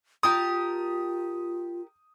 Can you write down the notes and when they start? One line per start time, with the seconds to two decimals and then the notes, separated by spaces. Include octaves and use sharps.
0.23 F4 G4 A#4 A5 D#6